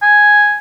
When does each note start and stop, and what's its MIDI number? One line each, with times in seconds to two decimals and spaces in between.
0.02 0.58 80